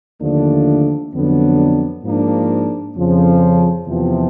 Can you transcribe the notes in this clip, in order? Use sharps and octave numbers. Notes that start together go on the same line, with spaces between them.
D#2 D3 F3 A3 D4
F2 D3 F#3 B3 D4
G#2 F3 A#3 D4
F2 C#3 F3
E2 C3 F3